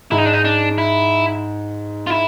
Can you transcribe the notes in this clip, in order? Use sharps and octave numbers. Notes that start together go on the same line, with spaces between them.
G#2 E4
D#4
D4
D#4
D4
E4
F4
E4